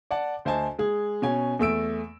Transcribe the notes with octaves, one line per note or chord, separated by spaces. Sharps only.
D5 F#5 A5
D2 C5 D#5 G#5 A5
G#3 G#4
B2 C#4 G#5
E2 A3 E6 D7